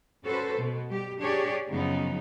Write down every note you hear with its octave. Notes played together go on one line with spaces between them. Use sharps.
C#4 F#4 A4 B4 C5
B2 B3
G3 G4
D4 G4 G#4 C#5 D5
F#2 C#3 F3 B3 D#4